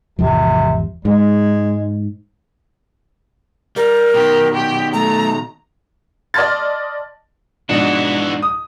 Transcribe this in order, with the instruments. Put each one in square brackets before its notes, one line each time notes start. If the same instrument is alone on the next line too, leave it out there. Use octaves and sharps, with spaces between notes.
[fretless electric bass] G#1 E2 F3 [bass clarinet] C3
[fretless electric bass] G#2 [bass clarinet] G#3
[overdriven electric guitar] G3 [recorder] A#4
[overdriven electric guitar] B2 D#3 [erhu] G4
[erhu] G4
[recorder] A3 [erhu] A#5
[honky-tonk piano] D5 D#5 A5 C6 F6 A6
[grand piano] G#2 B2 F3 [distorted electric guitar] E3 F#4 [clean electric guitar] D4
[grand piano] D#6